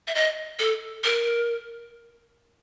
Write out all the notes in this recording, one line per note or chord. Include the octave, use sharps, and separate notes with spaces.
E5
D#5
A4
A#4